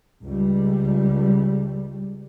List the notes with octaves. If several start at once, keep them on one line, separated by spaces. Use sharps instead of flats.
C#2 G3